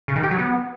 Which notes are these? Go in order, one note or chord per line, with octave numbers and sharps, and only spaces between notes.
C#3
D#3
G4
F#3
B3